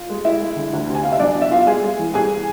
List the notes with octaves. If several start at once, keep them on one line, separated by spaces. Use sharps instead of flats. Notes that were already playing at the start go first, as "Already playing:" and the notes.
Already playing: F4
G#3
G#3 E4 E5
G#3
D3
D2
C3
G#5
C3 F5
E5
B1 D4 D5
B2
E5
B2 F4 F5
G#3 G#4 G#5
G#3
E3
C2 G#4 G#5